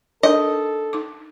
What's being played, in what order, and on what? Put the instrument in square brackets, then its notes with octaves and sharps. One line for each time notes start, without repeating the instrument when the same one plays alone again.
[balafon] D4 D#4 A#4 [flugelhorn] A4 [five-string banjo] D#5
[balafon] D#4 D6